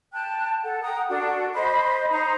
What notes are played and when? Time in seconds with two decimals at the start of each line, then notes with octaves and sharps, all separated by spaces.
0.12 G5 A5 F#6
0.62 A4 F#5
0.82 F#5 G5 A#5 D#6
1.09 D4 F#4 A4
1.53 C5 D#5 B5 C6
2.11 D#4 C5 A#5